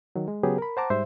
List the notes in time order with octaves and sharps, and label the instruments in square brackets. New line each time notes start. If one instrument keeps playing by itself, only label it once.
[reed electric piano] D#3 F#3
G#3
C#3 F#3 B3 G4 G#4
A#4 B5
C5 F#5 A5 A#5 D6
G#2 G3 C5 E5